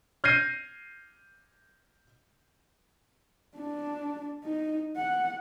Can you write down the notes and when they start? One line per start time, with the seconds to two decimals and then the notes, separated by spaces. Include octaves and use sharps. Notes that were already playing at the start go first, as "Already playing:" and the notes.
0.24 F6 G6 G#6 A#6 C7 D#7
3.57 D4
4.45 D#4
4.97 F#5